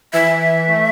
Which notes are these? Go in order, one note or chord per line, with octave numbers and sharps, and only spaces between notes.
E3 E5
E3
E3
A3